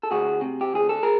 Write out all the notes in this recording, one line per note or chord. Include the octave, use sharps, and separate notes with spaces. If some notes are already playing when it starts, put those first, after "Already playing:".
A4
D2 F#4 G#4
C3
G4
D2 G#4
A4
G#4 A#4